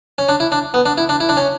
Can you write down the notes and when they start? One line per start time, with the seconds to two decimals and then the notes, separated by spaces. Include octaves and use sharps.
0.18 C#4
0.29 D4
0.40 E4
0.52 D4
0.74 B3
0.86 D4
0.98 E4
1.09 D4
1.20 E4
1.29 D4
1.37 C#4